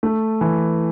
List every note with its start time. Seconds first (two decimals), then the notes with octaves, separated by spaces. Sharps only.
0.03 A3
0.41 E3